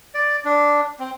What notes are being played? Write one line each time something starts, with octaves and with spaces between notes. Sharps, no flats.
D5
D4
C4